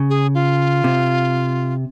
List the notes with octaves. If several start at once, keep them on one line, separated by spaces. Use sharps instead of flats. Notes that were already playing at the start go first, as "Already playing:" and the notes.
Already playing: C#3
G#4
F4
C3